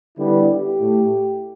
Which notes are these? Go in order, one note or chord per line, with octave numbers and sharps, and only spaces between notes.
D3 G3 B3 E4
G4
A2 A3